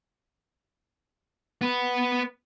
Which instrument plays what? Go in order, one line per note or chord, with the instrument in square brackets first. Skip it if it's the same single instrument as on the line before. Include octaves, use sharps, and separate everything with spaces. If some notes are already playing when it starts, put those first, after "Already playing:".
[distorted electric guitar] B3 B4